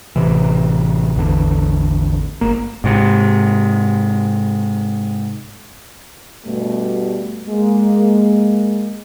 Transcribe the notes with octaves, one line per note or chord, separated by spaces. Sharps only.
A1 C3 E3
A1 E2 D3
G1 A#3
G#2 C3
G2 B2 G3 A3
G#3 A#3